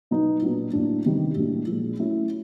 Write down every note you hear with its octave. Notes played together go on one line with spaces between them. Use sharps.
B2 F#3 B3 D#4
A#2 F#3 B3 D4
A2 F#3 A#3 D4
C3 D#3 G3 B3
A2 F#3 A#3 D4
A#2 F3 G#3
F#3 A3 C#4 E4